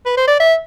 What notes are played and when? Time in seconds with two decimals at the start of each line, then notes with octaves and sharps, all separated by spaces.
0.06 B4
0.17 C5
0.28 D5
0.40 E5